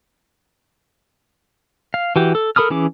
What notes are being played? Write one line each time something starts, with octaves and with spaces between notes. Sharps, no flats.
F5
E3 F#4 G4
A4
A4 A#4 B5 D#6 F6
E3 C#4 G#4 D6